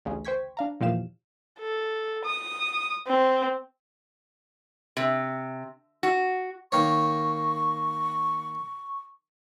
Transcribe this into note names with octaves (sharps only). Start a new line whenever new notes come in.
A1 D2 C#3
C5 G5 C#6 G#6 B6
D4 F5 A#5
E2 A#2 F3 G4 F5 E7
A4
D#6
C4
C3
F#4
D#3 A#3 C#5 C#6